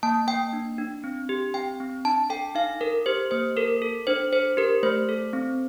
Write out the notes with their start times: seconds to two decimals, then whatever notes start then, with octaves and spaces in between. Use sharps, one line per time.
0.03 A#3 A5
0.27 A#3 G5
0.53 D4
0.78 D4
1.04 C4
1.29 G4
1.54 C4 G5
1.80 C4
2.05 D4 A5
2.30 A4 G5
2.55 D#4 F5
2.80 A4 A#4
3.06 G4 C5
3.31 A#3 C5
3.56 A4 A#4
3.82 A4
4.07 D4 C5
4.32 A4 C5
4.57 G4 A#4
4.83 A3 C5
5.09 A4
5.33 C4